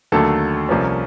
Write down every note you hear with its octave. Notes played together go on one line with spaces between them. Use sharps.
D#2 D3 F#3 A3 A4
C2 C3 F3 A#3 C#4